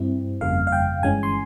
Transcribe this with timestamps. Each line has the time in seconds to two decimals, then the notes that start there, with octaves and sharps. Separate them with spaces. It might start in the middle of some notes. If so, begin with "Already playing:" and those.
Already playing: G2 G3 C4 E4
0.41 G1 F2 C#3 G3 A#3 F5
0.67 F5
0.72 G5
1.03 G1 G2 E3 G#3 C#4 G#5
1.23 C6